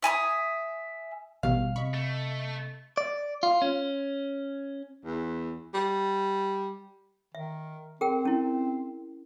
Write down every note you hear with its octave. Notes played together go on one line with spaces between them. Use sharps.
E5 G#5 A#5 D#6
A1 B2 G3 F5
C3 D#5 B5 C#6
A3
D5
F4
C#4
E2
G3
D#3 E5
C4 G#4 A#4 G5
C#4 E4